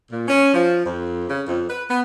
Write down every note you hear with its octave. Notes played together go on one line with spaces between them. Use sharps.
A#2
C#4
F3
F2
C#3
F2
B4
B3